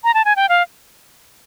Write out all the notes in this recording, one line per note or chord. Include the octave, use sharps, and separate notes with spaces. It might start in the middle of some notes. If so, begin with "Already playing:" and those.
A#5
A5
G#5
G5
F5